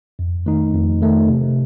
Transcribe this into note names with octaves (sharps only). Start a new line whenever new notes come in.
F2
D#3 A3 D#4
F2
D#3 A3 D#4
C3